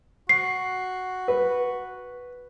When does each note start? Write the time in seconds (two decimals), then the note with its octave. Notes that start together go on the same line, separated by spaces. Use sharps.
0.29 F#4 C7
1.28 B4